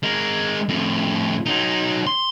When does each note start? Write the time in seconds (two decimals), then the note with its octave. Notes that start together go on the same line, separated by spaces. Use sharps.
0.03 G#3 A#4
0.69 F2 A2
1.46 F#3 D#4
2.07 C6